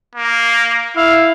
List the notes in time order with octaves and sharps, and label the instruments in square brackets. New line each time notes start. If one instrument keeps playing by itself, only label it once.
[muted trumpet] A#3
[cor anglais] E4 [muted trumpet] F5